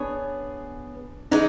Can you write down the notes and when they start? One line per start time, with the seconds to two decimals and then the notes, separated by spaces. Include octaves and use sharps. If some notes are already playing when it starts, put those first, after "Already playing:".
Already playing: B3 D4 G#4 C#5
1.31 E3 G#3 D#4